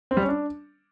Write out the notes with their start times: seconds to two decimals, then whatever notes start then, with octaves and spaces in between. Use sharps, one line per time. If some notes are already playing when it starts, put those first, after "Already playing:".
0.11 C4
0.17 G3
0.23 C#4
0.29 D4